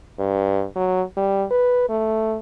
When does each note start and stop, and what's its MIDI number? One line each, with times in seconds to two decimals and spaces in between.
0.19 0.65 43
0.76 1.02 54
1.17 1.45 55
1.51 1.87 71
1.89 2.38 57